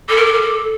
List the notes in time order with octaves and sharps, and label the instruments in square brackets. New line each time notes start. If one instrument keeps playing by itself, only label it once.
[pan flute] A4 [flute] D6
[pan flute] A#4
A4
A#4
A4